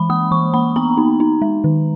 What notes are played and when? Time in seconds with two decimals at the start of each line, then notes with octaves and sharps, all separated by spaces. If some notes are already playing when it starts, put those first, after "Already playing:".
Already playing: E3 G#3 B5
0.10 A#3 D#6
0.31 E3 C#6
0.54 A#3 B5
0.76 B3 A#5
0.97 D#4
1.20 D#4
1.42 G#3
1.64 D#3